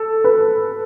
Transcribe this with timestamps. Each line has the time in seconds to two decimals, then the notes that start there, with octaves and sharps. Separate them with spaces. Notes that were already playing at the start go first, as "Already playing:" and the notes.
Already playing: A4
0.24 B4